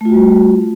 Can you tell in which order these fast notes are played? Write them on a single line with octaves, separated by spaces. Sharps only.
A3 F4 F#4 G3